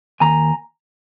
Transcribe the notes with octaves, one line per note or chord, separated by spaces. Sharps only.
D#2 G#5 A#5